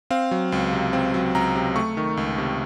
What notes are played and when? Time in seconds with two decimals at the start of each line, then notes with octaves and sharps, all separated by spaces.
0.10 C4 F5
0.31 F#3
0.52 C#2
0.73 C3
0.93 C4
1.14 F#3
1.35 C#2 A#5
1.55 C3
1.76 A3 C#6
1.97 D#3
2.17 C#2
2.38 C3